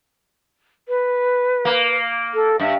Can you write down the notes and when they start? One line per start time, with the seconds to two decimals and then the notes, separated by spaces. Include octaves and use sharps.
0.88 B4
1.65 A#3
2.34 A4
2.60 G2 E5